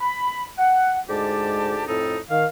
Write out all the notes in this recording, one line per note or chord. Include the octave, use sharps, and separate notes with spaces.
B5
F#5
D2 G#2 G#3 G4 D5 A5
F2 A2 C4 D#4 A4
D#3 F5